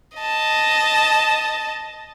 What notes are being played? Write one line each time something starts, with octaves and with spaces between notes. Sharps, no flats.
D#5 A5